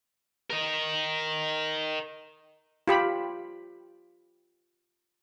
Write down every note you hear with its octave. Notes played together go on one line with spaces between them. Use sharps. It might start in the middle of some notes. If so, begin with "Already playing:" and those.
A#4 D#5
F4 G4 B5